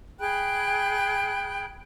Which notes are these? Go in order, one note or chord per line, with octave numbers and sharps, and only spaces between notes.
G#4 G5 B5 F#6